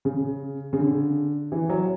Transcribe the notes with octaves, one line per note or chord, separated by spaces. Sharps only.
C#3
C#3
D3
E3
F#3